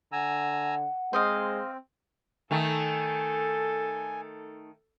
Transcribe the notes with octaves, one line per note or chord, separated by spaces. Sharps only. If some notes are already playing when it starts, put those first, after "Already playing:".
D3 F#5 G#5 A#5 E6
G#3 C4 C5 D#5 F5
D#3 A3 A4 G#5